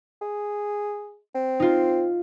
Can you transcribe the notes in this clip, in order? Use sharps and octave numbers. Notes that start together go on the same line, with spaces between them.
G#4
C4
D#4 F4